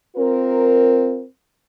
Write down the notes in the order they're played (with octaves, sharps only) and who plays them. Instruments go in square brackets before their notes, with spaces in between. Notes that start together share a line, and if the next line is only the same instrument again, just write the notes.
[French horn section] C4 F4 A#4